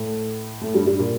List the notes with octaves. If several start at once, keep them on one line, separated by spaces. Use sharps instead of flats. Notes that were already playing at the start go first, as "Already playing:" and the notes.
Already playing: A2 A3
A2 A3
G2 G3
G2 G3
A#2 A#3